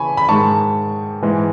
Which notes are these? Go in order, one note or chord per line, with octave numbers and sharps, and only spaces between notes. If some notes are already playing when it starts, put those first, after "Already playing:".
Already playing: C#3 E3 G#5 B5 C#6
B5
G#2 D#3 G#3 A5 C#6
G#2 E3 G#3